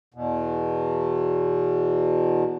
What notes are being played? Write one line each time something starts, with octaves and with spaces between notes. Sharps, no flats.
E2 B2